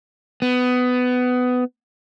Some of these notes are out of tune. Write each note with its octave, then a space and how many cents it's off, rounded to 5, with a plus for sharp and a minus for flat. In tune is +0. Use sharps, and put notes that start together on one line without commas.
B3 +20